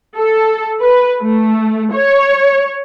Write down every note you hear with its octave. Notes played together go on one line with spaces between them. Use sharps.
A4
B4
A3
C#5